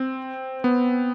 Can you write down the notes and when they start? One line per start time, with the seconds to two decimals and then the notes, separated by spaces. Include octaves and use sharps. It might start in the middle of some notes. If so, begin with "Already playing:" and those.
Already playing: C4
0.64 B3